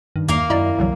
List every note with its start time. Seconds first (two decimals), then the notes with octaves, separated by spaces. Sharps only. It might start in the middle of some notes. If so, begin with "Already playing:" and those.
0.16 G2 D#3
0.28 E2 A#3 A#4 F5
0.50 F#2 E4 D5 D#5 A#5
0.78 C2 D3 E3 F#3